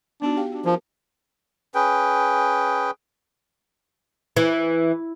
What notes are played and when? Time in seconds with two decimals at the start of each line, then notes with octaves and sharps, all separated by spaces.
0.22 B3 D4 D#4 F#4
0.37 G4 F5 G5
0.52 D4 F#4
0.66 F3 A#4
1.75 C#4 G#4 B4 G5
4.37 E3